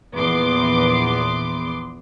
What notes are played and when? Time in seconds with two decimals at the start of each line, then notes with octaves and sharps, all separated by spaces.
0.15 A#1 E2 B3 C6 D6